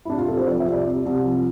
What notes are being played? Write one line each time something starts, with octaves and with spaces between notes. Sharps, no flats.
E4
C3 D4
F4
C2 A4
C5
F3 D5
E5
C2
D5
C3
C2
F3